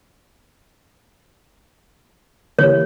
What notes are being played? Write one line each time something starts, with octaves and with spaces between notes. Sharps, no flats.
E3 A#3 G4 C#5